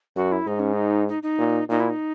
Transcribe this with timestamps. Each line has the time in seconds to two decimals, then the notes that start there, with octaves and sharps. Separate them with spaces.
0.16 F#2 F#4
0.32 E4
0.47 G#2 D#4
0.59 C#4
0.73 D#4
1.08 D#4
1.23 D#4
1.39 A#2
1.69 A#2 D#4
1.80 E4
1.89 D#4